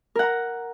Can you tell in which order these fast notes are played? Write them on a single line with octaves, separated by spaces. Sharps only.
A#4 F#5 A#5